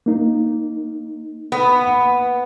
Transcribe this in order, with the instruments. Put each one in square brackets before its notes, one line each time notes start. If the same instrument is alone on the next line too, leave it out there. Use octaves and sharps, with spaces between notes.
[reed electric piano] A#3 D#4
[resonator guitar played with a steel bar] B3